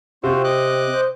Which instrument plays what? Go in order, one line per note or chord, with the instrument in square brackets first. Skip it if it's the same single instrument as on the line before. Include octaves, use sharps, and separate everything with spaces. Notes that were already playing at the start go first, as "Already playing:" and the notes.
[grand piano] C3 [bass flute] C4 [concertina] F4 F#4 C5
[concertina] D#5 D6 F#6
[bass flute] C5